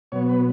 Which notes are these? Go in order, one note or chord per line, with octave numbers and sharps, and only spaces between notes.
B2 F#3 B3 C#5
B4